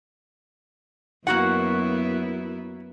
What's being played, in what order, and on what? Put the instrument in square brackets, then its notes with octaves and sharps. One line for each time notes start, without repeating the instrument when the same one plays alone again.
[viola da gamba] F#2 B3 E4 [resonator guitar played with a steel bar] A#3 F#4 F#5